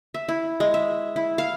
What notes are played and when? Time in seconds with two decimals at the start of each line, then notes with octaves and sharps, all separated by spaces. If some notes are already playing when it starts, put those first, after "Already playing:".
0.14 E5
0.29 E4
0.60 G#3
0.74 E5
1.16 E4
1.38 F5